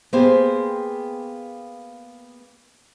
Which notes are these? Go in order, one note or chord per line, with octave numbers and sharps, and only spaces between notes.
A#3 B3 G4 G#4 C5